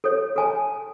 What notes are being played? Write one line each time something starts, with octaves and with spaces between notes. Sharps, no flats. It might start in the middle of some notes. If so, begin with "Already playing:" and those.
A4 C#5
A4 G#5 A5